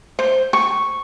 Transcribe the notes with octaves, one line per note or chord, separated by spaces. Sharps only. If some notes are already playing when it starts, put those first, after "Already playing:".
C5
C#6